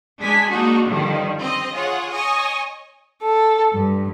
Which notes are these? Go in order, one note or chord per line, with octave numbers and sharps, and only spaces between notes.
G#3 D4 G#5 B6
G#3 A#3 D4 D#4 F#4
G2 D3 D#3 F3 G3
C4 D#5
F4 G#4 C#5 F#5
C#5 D#5 G#5 C#6 D#6
A4
G2